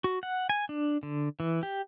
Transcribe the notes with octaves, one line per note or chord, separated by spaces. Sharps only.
F#4
F#5
G#5
D4
D3
E3
G4